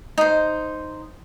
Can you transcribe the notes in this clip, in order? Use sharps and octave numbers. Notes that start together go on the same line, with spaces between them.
D#4 C5